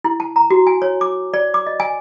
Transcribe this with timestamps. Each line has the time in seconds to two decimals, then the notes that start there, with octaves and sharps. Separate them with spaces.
0.04 E4
0.20 A5
0.36 A#5
0.51 F#4
0.67 G#5
0.82 C#5
1.01 D6
1.34 D5
1.54 D6
1.67 D#5
1.80 G#5